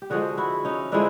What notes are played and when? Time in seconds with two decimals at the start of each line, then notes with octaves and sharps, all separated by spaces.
0.02 G4
0.10 D3 F3 G#3 F#4 G#4
0.37 E4 F#4
0.65 C#4 D#4
0.92 D3 F3 G#3 D4 E4